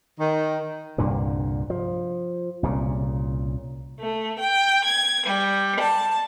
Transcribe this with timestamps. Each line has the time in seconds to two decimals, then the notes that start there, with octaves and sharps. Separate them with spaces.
0.19 D#3
0.98 C2 G2 A#2 D3
1.70 F3
2.63 C2 A#2 C#3
3.99 A3
4.38 G5
4.84 G#6
5.27 G3
5.80 A5